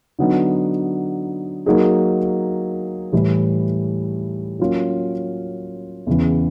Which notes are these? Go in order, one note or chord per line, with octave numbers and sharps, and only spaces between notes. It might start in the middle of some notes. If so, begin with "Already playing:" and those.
D3 F#3 B3 D#4
F#3 A#3 D#4 G#4
A2 E3 G3
F#3 A#3 C#4 F4
E2 C#3 E3